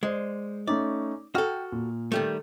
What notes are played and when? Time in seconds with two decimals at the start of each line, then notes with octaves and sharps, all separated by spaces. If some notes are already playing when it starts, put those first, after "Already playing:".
0.03 G#3 C5 D5
0.67 A3 C#4 D#4 D5
1.35 F#4 A4 G5 F6
1.72 A#2
2.12 D#3 G3 A3